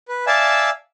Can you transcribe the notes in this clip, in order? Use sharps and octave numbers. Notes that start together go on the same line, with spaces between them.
B4
D5 E5 F5 G#5 A5 E6